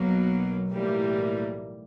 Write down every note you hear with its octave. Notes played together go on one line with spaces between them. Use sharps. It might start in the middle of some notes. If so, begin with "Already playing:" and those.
Already playing: B1 B2 F#3 A#3
B1 A2 E3 G3 A#3